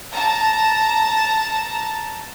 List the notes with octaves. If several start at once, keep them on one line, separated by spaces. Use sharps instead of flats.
A5 A#5